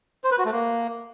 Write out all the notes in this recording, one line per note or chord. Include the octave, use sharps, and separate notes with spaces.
C5
B4
F#4
A3
A#3